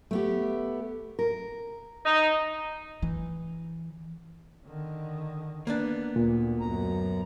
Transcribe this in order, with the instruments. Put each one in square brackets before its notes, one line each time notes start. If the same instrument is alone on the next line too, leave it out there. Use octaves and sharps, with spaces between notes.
[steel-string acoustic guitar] A3 B3 G4
A#4
[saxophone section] D#4
[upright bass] E3
[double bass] D3 D#3
[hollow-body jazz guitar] A#3 B3 D4
[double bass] D2 [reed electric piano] A#2
[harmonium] F#2 A#5